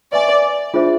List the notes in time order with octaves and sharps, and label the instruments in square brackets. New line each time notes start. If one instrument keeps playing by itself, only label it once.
[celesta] B4 E5 G#5 C#6 [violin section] D5
[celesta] D4 F4 G#4 C5 E5